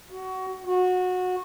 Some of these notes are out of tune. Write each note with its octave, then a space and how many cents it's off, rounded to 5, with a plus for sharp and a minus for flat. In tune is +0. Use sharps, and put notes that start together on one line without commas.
F#4 +20
F#4 -20